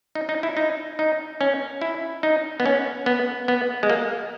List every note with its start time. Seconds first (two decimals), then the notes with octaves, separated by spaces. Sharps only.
0.15 D#4
0.29 D#4
0.43 E4
0.57 D#4
0.99 D#4
1.41 C#4
1.81 E4
2.23 D#4
2.60 B3
2.66 C#4
3.06 B3
3.48 B3
3.83 G#3
3.90 A#3